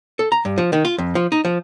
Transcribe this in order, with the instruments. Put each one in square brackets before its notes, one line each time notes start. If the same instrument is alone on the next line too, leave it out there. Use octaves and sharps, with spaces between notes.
[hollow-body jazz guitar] A4
A#5
G2
F3
D#3
F4
F2
F3
D#4
F3